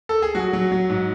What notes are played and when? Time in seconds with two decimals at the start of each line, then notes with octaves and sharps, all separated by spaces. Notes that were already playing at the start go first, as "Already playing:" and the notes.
0.09 A4
0.22 G#4
0.35 F#3 F#4
0.53 F#3
0.72 F#3
0.89 G#2